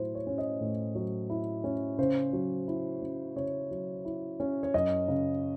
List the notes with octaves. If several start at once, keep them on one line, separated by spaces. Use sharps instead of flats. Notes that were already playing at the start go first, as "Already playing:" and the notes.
Already playing: A2 F#3 E4 C5
C#5
C#4
D#5
A2
F#3
E4
C#4
C#3 C5
F#3
E4
C#4
C#3 C#5
F#3
E4
C#4
C#5
F#2 D#5
C#3